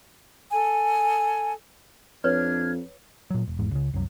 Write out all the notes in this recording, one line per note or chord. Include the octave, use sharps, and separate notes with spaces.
A4 G#5
F2 D4 B4 C#5 F6 G#6
A#2 F#3
E1
G#1 E2 G#2
C#2 C#3
C2 F#2 F#3